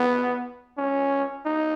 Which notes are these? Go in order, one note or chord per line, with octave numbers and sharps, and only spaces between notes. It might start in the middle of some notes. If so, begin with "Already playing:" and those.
Already playing: B3
C#4
D#4